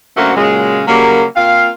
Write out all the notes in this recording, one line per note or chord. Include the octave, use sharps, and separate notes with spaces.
F#2 D3 A3 A#3 C4 F#4
A#2 C#3 F#3 G#3
C#3 F#3 G3 A#3
A#3 C4 F4 F5